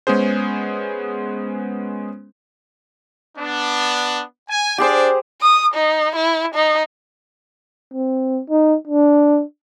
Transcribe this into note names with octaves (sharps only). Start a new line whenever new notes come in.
G#3 B3 C#4 G#4 C5
B3 D4
G#5
D4 G4 G#4 C5 D5
D#6
D#4
E4
D#4
C4
D#4
D4